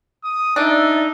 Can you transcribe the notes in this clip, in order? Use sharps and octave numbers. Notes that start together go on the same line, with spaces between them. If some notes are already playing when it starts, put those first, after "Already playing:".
D#6
D4 D#4 D5 E5 E6